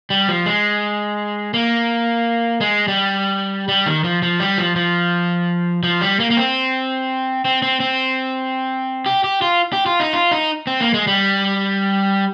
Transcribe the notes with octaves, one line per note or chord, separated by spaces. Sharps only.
G3
F3
G#3
A#3
G#3
G3
G3
D#3
F3
F3
G3
F3
F3
F3
G3
A#3
A#3
C4
C4
C4
C4
G4
G4
F4
G4
F4
D#4
F4
D#4
C4
A#3
G#3
G3